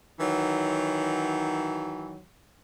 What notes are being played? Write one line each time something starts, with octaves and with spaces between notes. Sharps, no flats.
D#3 E3 F#3